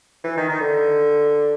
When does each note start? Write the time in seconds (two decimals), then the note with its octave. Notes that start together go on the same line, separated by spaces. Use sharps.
0.24 E3
0.37 D#3
0.49 D#3
0.60 D3